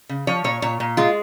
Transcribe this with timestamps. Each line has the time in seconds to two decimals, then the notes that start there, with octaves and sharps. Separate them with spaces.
0.09 C#3
0.27 F3 C#5
0.44 A#2 C#5
0.62 A#2 C#5
0.80 A#2
0.97 G#3 F4